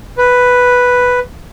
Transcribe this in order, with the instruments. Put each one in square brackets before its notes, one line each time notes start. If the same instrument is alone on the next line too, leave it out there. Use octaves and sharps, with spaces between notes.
[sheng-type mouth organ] B4